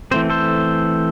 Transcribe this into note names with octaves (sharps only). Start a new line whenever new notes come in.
E3 A3 C4 C5
A4 C5